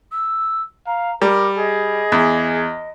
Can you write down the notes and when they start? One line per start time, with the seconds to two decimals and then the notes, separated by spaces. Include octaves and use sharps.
0.11 E6
0.86 F5 A#5
1.22 G3 A#4 D6
1.58 G#4 D#5
2.12 E2